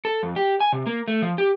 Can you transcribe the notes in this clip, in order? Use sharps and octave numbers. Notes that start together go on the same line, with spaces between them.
A4
F2
G4
G#5
C3
A#3
A3
F3
G4